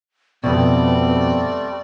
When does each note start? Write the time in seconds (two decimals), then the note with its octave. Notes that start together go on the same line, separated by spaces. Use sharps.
0.44 F2 B2 G3 A3 B3 C4 D5